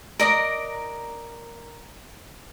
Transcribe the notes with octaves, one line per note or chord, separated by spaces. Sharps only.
A#4 D5 D#5 A#5